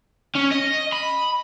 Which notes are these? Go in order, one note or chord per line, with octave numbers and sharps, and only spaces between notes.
C#4
D#5
B5